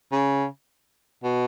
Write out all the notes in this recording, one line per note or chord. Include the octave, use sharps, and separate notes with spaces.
C#3
B2